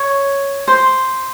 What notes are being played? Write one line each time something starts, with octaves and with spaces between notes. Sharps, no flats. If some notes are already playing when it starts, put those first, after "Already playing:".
Already playing: C#5
C5